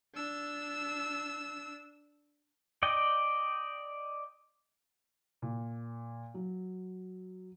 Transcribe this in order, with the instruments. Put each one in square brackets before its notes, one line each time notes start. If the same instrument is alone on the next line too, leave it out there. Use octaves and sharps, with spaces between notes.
[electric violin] D4 E6
[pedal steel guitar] D5 D#5 G5
[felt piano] A#2
F#3